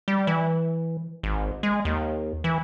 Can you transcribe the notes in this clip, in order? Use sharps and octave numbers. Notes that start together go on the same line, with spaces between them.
G3
E3
G#1
G#3
D#2
E3